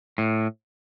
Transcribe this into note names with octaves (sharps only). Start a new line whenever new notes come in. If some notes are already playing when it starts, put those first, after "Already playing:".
A2